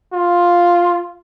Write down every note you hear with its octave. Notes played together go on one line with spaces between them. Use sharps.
F4